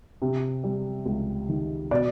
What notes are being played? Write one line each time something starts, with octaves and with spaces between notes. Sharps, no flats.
C3
G3
C#2
D#3
B2 D5